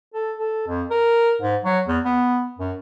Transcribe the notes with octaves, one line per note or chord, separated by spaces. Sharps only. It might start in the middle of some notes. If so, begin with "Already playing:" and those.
A4
A4
F2
A#4
G#2
F#3
E2
B3
F#2